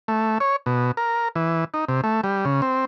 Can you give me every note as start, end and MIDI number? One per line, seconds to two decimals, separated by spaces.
0.08 0.38 57
0.40 0.56 73
0.66 0.91 47
0.97 1.28 70
1.36 1.64 52
1.74 1.85 63
1.89 2.01 48
2.04 2.21 57
2.24 2.45 55
2.45 2.61 49
2.62 2.85 60